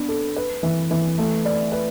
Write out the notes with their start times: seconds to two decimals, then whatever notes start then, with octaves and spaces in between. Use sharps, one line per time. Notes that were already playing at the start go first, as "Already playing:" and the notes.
Already playing: B3 D4
0.09 A4
0.36 B4
0.63 E3
0.91 E3
1.18 A3
1.45 D5
1.72 B4